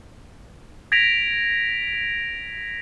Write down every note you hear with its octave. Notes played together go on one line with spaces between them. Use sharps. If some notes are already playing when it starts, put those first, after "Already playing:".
G#6 A#6 B6 D7 F7